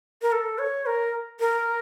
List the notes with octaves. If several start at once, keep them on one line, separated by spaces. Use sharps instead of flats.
A#4
A4
C#5
A#4
A#4